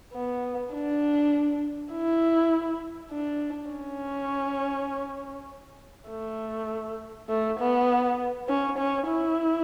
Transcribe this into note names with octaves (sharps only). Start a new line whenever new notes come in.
B3
D4
E4
D4
C#4
A3
A3
B3
C#4
C#4
E4